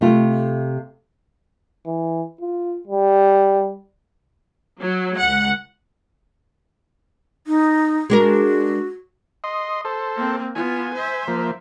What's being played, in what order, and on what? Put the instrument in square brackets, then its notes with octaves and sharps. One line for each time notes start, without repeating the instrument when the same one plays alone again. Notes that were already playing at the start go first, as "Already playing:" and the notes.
[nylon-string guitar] C3 A3 F4
[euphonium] E3
F4
G3
[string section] F#3
C#2 F#5
[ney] D#4
[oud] G#3 D4 A#4 [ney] F#4
[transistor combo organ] D#5 C6
A4 C5
[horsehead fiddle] A#3 C4
[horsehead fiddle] B3 F4 [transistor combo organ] G#5
[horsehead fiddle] C5 E5
[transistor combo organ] F3 A#3